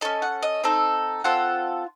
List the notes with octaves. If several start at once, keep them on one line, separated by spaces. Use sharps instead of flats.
C#4 A4 D#5
F#5
D#5
C4 D#4 A4
C4 F4 A4 F#5